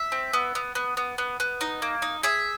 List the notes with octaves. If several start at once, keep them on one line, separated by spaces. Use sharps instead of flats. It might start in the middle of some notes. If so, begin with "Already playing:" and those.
Already playing: E5
C4
B3
B3
B3
B3
B3
B3
D#4
A#3
D#4
G#4 E5